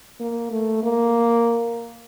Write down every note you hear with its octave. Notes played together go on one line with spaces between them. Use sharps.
A#3
A3
A#3